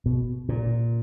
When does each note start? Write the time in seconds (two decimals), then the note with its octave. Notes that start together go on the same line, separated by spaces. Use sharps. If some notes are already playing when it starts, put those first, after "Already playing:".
0.06 B2
0.49 A#2